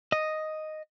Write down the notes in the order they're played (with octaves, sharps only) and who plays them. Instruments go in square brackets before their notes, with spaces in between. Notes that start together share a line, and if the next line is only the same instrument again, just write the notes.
[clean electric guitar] D#5